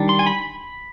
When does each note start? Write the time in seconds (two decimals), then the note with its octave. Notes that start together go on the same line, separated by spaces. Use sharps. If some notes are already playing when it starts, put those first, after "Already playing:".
Already playing: D#3 G3 D4
0.09 C6
0.19 G#5
0.26 B5